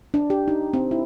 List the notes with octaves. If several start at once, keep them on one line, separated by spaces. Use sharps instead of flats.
D4
G4
D#4
C4
E4